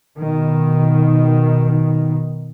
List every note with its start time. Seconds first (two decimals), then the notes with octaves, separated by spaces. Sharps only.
0.18 B2 D#3